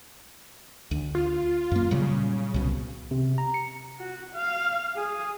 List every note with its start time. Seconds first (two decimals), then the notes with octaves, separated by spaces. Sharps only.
0.91 D2
1.15 F4
1.72 F#2 A#3
1.91 A#2 C#3 F#3 G3
2.54 C2 B2
3.11 C3
3.38 A#5
3.54 C#7
4.00 F#4
4.35 F5
4.96 G#4